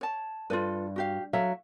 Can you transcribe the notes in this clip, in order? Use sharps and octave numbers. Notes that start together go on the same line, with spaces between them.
C#5 A5
G2 F4 A4 B4
F#4 G4 F5
F#3 A4 E5 F5